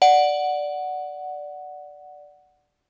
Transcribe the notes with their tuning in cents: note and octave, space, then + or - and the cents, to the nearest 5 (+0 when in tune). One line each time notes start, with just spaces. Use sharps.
D5 +0 F#5 +0